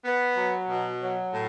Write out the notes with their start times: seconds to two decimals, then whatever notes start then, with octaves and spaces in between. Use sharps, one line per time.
0.05 B3
0.37 F#3
0.69 B2
1.02 F#3
1.33 A2